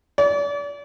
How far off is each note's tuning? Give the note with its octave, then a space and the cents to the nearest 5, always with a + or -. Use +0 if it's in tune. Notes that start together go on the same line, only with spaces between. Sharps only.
D5 -40